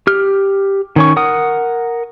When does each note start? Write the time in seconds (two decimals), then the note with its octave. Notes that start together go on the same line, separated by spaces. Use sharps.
0.07 G4 F6
0.96 D#3 C#4 C#6
1.16 A#4 F#5 D#6